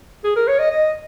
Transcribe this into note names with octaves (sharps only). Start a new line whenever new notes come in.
G#4
A#4
C#5
D#5
D#5